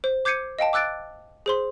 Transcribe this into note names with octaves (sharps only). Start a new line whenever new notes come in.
C5
D6 G6 G#6 C7 C#7 D#7
D#5 F5 G5 A5
D6 E6 F#6 A6 D7
G#4 C5 C6